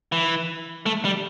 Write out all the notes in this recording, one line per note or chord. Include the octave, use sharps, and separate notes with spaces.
E3
A3
G3